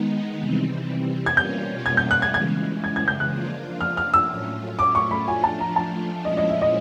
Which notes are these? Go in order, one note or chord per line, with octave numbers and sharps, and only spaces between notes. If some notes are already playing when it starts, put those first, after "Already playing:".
Already playing: D#3 G#3 B3 D#4
C3 E3 G3 C4
G#6
B2 G3 A#3 C#4 F4 G6
G#6
G6
F#6
G#6
C#3 E3 G#3 G#6
G#6
G#6
G6
F#6
F3 A#3 D4 F4
F6
F6
E6
A2 F#3 A3 C#4 F4
D6
C#6
B5
F3 A3 D4 F4 G#5
A5
A#5
A5
A#2 F3 G#3 C#4 E4 D#5
D#5
E5
D#5